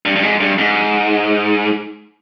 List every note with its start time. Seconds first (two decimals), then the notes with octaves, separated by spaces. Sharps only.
0.05 G2
0.16 G2
0.23 G#2
0.41 G2
0.58 G#2